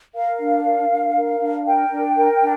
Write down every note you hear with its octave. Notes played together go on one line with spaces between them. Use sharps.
A#4 F5
D4
A#4
D4
A#4
D4
A#4 G5
D4
A#4
D4